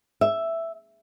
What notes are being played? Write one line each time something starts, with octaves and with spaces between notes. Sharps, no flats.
E5